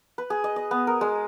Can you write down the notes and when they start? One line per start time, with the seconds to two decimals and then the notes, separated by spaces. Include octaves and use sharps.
0.18 B4
0.30 G#4
0.44 D#5
0.56 D#5
0.71 B3
0.87 A#4
1.01 G#3